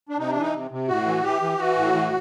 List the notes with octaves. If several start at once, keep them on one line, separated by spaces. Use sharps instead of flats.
D4
C3 D#4
D4
E3
D#4
C3
C3
A2 F#4
E3
E3 G4
E3
E3 F#4
A2
E3